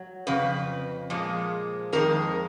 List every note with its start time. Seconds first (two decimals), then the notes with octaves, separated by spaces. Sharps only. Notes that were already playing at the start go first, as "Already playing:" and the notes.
Already playing: F#3
0.27 F2 C#3 B4
1.10 A#2 F3 G#3
1.93 F2 D#3 G#3 A#4